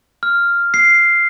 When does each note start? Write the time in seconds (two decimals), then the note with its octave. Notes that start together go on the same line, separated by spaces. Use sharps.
0.23 F6
0.74 C7